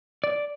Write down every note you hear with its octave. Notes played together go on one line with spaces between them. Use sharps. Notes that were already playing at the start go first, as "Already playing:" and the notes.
D5